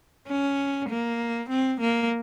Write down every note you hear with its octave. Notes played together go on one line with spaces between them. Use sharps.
C#4
A#3
C4
A#3